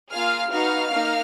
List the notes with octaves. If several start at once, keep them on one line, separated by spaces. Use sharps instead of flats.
A#3 F4 G#4 F5 F6
B3 D#4 F#4 F5 F6
A#3 D#4